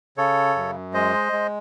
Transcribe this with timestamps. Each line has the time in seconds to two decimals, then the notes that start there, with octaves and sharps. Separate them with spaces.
0.17 C#3 A4 C#5
0.55 F#2
0.94 G#3 C5 D#5
1.32 G#3